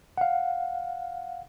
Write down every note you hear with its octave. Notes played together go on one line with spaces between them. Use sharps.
F5 F#5